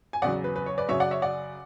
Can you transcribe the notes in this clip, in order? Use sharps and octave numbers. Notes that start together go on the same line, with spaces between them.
G#5
E2 C#3 F#3 D5 F#5
B4
B4
C#5
B4 D5
F#2 C#3 F#3 C#5 E5
D5 F#5
C#5 E5
D5 F#5